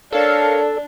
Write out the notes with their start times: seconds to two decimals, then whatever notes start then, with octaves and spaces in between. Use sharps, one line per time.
0.13 D4 A4 A#4 C#5 F5